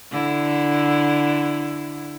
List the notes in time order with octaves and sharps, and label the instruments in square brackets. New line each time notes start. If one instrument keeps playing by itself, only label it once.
[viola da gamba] D3 E4